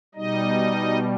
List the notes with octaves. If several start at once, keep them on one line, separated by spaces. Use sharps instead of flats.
B2 G3 D#4 D#5